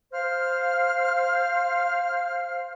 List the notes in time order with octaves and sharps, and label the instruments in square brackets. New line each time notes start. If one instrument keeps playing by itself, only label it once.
[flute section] C5 F5 F6